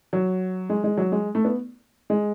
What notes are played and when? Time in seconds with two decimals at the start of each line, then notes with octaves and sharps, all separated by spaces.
0.13 F#3
0.69 G#3
0.84 G#3
0.98 F#3
1.12 G#3
1.35 A3
1.45 B3
2.10 G#3